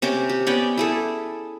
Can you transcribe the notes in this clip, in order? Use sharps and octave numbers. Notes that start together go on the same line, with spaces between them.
C3 C#4 C5 D6
G4
B3 C#4 D5 G5
E4 G#4 A4